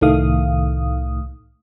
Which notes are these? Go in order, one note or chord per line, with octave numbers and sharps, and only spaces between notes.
C2 A2 D#3 A3 F5 D#6